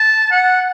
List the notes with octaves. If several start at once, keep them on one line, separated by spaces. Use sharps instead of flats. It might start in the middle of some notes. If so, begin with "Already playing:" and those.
Already playing: A5
F#5